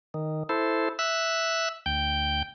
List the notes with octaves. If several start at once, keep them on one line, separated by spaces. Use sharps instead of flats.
D#3
E4 A4 C5
E5 E6 F#6
D2 G5 G6